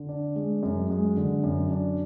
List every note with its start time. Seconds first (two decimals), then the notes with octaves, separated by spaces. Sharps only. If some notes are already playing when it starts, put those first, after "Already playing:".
Already playing: D3
0.09 D4
0.36 G#3
0.63 F#2
0.90 G#3
1.17 D3
1.44 F#2
1.71 D4